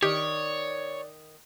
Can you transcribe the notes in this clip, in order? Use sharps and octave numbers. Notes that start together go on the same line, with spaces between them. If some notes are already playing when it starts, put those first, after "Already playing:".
D#3 G4 C#5 D5